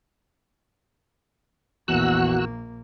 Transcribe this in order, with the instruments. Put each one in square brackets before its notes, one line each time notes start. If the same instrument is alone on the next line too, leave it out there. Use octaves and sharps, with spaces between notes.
[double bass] A#1 A#3 [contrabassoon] E2 [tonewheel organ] F#4 E6 F#6